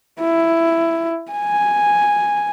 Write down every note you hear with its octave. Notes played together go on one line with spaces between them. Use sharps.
E4
G#5